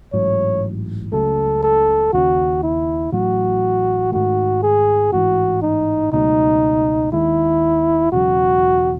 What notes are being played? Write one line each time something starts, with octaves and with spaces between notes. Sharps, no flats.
A1 G#2 F#3 C#5
C#2 C#3 F#3 A3 A4
A4
D#2 C#3 G#3 C#4 F#4
E4
A1 A2 F#3 F#4
G#2 D#3 A3 F#4
G#4
A1 G#2 E3 F#4
D#4
C#2 B2 F#3 A3 D#4
D#2 D#3 G#3 E4
E1 E2 C#3 F#3 F#4